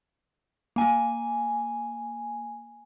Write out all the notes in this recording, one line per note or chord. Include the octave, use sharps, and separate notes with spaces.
A#3 G#5